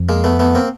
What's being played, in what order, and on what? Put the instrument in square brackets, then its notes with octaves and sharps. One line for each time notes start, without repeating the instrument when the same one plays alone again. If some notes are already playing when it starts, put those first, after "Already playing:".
Already playing: [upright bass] F2
[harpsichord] G#3 A#3
A3 B3
A3 B3
A#3 C4